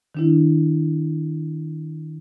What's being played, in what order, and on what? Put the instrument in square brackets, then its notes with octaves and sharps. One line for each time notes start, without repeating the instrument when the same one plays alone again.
[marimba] D#3 D4 E4